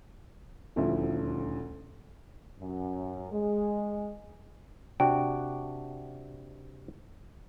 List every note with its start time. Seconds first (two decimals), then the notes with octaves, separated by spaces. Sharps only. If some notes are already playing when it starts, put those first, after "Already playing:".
0.76 D#1 D2 D3 F3 E4
2.59 F#2
3.32 G#3
5.00 C3 D4 F#4 G5